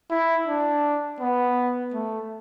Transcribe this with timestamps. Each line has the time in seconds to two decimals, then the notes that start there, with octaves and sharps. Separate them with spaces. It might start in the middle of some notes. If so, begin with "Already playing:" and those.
0.10 E4
0.47 D4
1.20 B3
1.93 A3